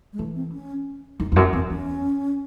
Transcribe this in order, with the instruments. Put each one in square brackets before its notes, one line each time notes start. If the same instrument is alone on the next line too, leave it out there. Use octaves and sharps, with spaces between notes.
[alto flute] G#3
[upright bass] E3 [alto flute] A3
[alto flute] C4
C#4
[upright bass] F#2 [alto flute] D#4
[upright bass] E2
[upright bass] F#2 [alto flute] C4
[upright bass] E2 [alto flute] C4
[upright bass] E2 [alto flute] C#4